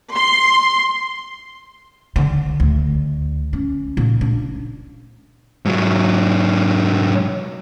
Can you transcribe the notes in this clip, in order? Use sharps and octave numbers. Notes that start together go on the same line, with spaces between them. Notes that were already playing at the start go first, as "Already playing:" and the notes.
C6
D3
D2
C#4
A#2
D4
G#2 F#3